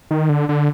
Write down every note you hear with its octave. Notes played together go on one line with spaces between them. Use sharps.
D#3
D3
D3